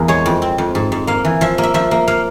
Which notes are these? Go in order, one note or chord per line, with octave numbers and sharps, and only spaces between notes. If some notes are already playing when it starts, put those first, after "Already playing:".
Already playing: E2 A#3
G#3 C#5
F2
C4
F2
G#2
G#2
A#3 F5
E3
F3 E5
A#3
E5
F3 E5
A#3
A#3 F5